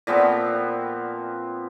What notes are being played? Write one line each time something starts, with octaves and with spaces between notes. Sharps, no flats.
A#2 F3 B3 C4